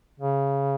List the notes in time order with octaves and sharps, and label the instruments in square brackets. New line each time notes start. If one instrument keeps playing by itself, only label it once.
[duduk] C#3